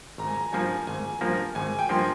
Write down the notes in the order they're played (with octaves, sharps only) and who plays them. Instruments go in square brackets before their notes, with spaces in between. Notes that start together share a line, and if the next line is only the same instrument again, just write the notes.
[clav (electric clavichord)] G#1 [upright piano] A#5
[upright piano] G#5
A#5
[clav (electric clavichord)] G2 F3 A#3 [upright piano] G#5
[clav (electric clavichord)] G#1 [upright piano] G#5
[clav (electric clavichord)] G2 F3 A#3
[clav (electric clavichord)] G#1 [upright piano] G#5
[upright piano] G5
[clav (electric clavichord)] G2 F3 A#3 [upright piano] C6